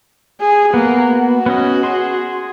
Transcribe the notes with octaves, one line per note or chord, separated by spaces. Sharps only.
G#4
A#3 B3
F#4
B3 C#4 D#5
G#4 C6